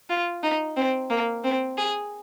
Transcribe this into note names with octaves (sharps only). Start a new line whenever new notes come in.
F4
D#4
C4
A#3
C4
G#4